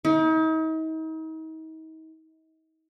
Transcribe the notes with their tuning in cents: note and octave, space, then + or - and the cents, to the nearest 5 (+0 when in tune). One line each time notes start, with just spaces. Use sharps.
D#4 +40